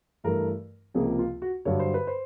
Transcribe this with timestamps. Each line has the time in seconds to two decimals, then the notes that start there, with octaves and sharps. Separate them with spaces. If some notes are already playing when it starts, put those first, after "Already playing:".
0.24 G2 E3 A3 A#4
0.94 C#2 C3 F3 A#3 G#4
1.19 F4
1.42 F#4
1.65 G2 D3 F#3 C#5
1.79 C5
1.94 B4
2.07 C5